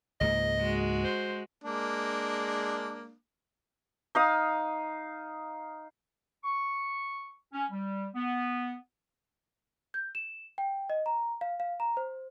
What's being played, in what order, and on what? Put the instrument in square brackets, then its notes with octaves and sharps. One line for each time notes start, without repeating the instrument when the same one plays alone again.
[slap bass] C#2 G#2 A#3 [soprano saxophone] D#5
[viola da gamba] G#3 F#4
[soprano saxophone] C5
[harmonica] G#3 A#3 D4
[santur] D#4 F5 D#6
[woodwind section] C#6
C#4
G3
B3
[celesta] G6
E7
G5
D#5
A#5
F5
F5
A#5
C5